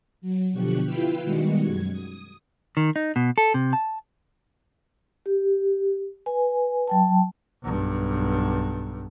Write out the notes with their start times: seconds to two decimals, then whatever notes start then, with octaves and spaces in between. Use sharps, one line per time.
0.21 F#3
0.52 B2 D3 F3 G4 C#6 F#6
0.85 E4 F4 B4 F5 G5 E6
1.23 B2 D#3 G3 G#3 F#4 C#7
1.62 F#2 G#6
1.92 D#6
2.77 D#3
2.96 D#4
3.16 B2
3.38 A4
3.54 C3
3.73 A5
5.26 G4
6.26 B4 G#5
6.87 F#3 G5 A5
7.62 B1 G2